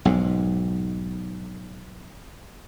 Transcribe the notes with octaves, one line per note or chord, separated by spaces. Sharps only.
B1 G#2